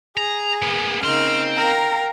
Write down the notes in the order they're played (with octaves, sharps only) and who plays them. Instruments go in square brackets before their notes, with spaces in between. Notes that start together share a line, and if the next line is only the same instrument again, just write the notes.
[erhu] G#4 [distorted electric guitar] A#5
[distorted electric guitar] A#3 B3
[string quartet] C#3 A#3 D#4 [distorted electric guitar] C4 C6 [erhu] F6
[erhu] A#4 [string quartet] F5 G5 A#5